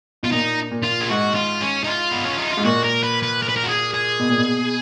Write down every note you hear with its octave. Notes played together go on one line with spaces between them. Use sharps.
B2 F4
A#2 D#4
A#2
F4
G#4
G#2 F#4
F4
C#4
D#4
F4
B3
C#4
D#4
F4
G#2
A#2 F#4
A#4
B4
B4
A#4
B4
A#4
F#4
G#4
G#4
B2
A#2
B2